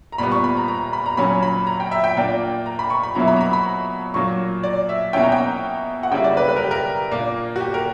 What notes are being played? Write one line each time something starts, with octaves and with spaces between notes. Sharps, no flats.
A#5
A#2 G3 B3 B5
C#6
B5
A#5
A#5
B5
A#5
A#2 F#3 C#4 B5
B5
A#5
G5
E5
G5
A#2 A#3 D4 G5
A#5
B5
C#6
B5
B2 F#3 A#3 E4 A#5
B5
A#5
B5
B5
A#2 F#3 A#3 C#6
D5
E5
B2 A#3 C#4 E4 G5
A#5
G5
F#5
C#3 G3 A#3 E4 G5
D5
B4
B4
A#4
G4
A#4
A#2 A#3 D4
F#4
G4
A#4